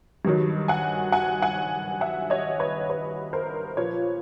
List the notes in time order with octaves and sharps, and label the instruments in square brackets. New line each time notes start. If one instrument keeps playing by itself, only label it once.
[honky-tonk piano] G2 D#3 F#3
F#5 G#5
F#5 G#5
F#5 G#5
E5 F#5
C#5 D#5
B4 C#5
B4 C#5
A#4 C5
A#2 F3 B4 C#5